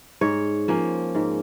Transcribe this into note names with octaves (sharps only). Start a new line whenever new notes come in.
G#2 C#5
F3 A#3 C#4
G#2